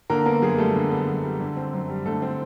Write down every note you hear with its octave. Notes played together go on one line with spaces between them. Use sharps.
D3 A#3 A#4
A#3 B3 A#4
F#2 G#4
G3 A3 A4
D3
B3
F#2
G3
D3
C4
F#2
G3
D3 A3 A4
C4